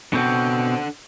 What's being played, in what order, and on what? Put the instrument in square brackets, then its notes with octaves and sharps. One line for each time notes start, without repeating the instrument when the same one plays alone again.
[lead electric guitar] B2 C4 [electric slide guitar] D4 A4 F#5